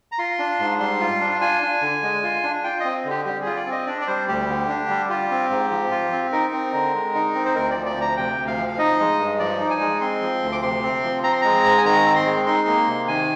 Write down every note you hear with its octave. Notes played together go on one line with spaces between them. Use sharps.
A#5
F4 C6
D4
G#2
G3 C6
F4
D4
F4 G#5
D4
D3
G#3
F4
D4
F4 G5
C4 D#5
D3
G4
G3 G4
F4 G#4
D5
C4
D#5
D4 D5
D5
G3 C5
D2 G4
D3
D4
G3
F4 G4
C4
G#2
F3
F4
C4
D#4 A#4
C4
D3
G#3
D#4
C4
C5
D2 A#4
D5
F3
D5
D2 A#5
C3 G5
D2
F5
F3
F5
D#4 D#5
G#3
G2
F3 D5
D#4
G#5
G#3
C4 C6
F3
D2
D6
C3 C6
C4
F3
C4 A#5
C6
G#3 A#5
G#2
G#5
D#3 A#5
C4
C6
G#3
D#4 C6
A#3
C3
D#3 G#5